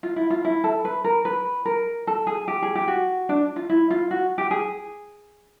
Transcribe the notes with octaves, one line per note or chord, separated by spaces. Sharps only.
F4
E4
F4
E4
A4
B4
A#4
B4
A#4
A4
G#4
G4
G#4
G4
F#4
D4
F4
E4
F4
F#4
G4
G#4